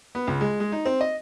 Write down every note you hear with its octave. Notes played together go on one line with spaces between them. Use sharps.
B3
C#2
G#3
G#3
D#4
C4
D#5